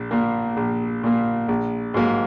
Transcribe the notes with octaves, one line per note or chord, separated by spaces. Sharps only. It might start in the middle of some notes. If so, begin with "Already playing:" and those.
Already playing: A#1
A#2 A#3
A#1
A#2 A#3
A#1
G#2 F#3 A#3